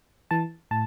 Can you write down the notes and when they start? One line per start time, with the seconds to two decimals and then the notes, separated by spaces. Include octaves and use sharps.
0.31 E3 A5
0.71 A2 A5